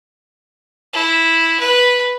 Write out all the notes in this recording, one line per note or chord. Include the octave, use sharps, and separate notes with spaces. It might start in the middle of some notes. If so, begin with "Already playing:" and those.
E4
B4